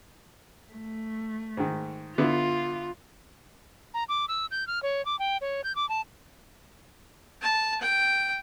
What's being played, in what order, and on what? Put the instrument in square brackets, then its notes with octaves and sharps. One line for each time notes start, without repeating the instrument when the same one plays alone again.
[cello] A3
[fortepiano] G#2 D#3
[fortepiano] D3 B3 E4 [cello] F4
[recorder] A#5
D6
E6
G6
F6
C#5
D6
G5
C#5
G6
D6
A5
[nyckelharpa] A5
G5